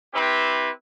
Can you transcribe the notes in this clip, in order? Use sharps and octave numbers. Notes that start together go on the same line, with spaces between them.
C4 E4 G4 B4